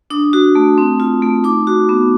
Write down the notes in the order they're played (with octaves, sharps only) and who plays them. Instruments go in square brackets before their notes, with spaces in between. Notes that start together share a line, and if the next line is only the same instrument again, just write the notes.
[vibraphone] D4 D#6
F#4
A3
C4
F4
A3
D#4 D6
F#4
B3